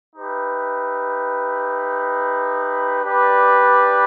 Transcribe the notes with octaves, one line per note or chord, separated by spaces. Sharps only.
D#4 G4 B4 E5
D4 G4 B4 D5